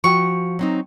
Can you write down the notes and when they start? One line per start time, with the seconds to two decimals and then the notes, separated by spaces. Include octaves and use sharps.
0.04 F3 F#4 G5 C#6
0.59 F#3 C4 D#4